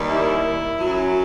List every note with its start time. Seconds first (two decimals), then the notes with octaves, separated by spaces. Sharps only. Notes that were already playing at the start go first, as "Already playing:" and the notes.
Already playing: D#2 D#3 G3
0.10 E4
0.79 F#2 F#3